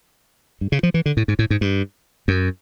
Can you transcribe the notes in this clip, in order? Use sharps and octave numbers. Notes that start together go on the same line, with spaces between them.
G2
C#3
F3
E3
D3
A2
G#2
A2
G#2
G2
F#2